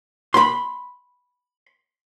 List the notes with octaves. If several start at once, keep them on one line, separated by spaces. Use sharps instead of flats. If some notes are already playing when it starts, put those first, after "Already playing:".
B5 C6